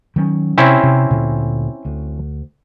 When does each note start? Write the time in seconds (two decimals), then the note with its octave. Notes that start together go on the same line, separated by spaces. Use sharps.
0.16 D#3 F#3 C#4
0.58 C3 C4 C#4 E4
0.83 C3
1.10 D2 A#2 D3
1.85 D2